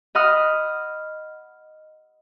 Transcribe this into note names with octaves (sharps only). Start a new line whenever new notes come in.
D#5 F#5 B5 D#6 F6